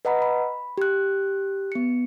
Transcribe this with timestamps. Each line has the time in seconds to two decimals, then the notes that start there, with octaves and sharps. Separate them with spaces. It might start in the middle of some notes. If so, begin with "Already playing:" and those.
0.05 B4 D#5 F#5 A#5 B5
0.22 B5
0.78 G4 F#6
1.72 B3 C#7